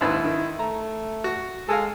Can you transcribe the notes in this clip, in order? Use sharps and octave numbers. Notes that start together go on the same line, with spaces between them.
D#2 G#2 E4 B4
D#3
A3 A#5
F#4
G#3 A4 F5